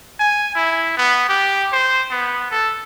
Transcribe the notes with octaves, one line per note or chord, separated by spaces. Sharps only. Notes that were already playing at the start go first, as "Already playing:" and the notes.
G#5
E4
B3
G4
C5
B3
A4